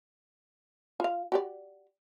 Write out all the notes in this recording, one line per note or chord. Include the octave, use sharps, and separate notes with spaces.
F4 F5
F#4 G4 D5